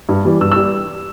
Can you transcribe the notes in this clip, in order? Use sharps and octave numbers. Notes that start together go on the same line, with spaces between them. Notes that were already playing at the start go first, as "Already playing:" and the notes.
G2
E3 G3
G2 E6
E6
G3